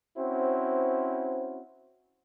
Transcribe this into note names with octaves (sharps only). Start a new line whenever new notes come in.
C4 C#4 E4 F#4 C5